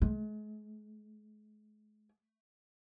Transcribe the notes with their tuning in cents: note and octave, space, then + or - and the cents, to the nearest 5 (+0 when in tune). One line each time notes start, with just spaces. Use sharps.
G#3 +40